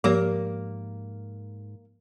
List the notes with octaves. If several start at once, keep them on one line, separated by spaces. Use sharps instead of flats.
G#2 F3 A#3 G4 C#5